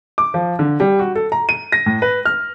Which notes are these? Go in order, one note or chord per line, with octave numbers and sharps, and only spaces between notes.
D6
F3
D3
G3
F#4
A4
A#5
D#7
A#6
A2
B4
F6